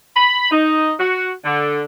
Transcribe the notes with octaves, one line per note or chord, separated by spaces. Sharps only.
B5
D#4
F#4
D3